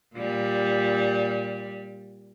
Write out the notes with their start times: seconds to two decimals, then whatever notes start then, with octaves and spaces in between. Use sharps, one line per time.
0.15 A#2 G3